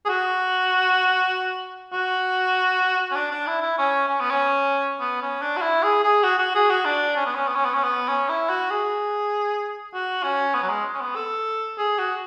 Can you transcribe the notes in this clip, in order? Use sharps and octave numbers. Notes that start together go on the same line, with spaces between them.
G#4
F#4
F#4
C#4
D4
D4
E4
E4
C#4
C#4
B3
C#4
B3
C#4
D4
F#4
E4
G#4
G#4
F#4
F#4
G#4
F#4
D4
C#4
B3
C#4
B3
C#4
B3
C#4
B3
C#4
E4
F#4
G#4
F#4
C#4
B3
F#3
G#3
C#4
B3
A4
G#4
F#4